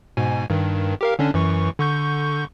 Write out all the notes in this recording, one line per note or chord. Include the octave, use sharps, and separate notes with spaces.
G#2 B2 G#5
G2 D#3
G4 A#4 F5
D3 C#4 D4
F#2 E3 C#6
D3 C#6 G6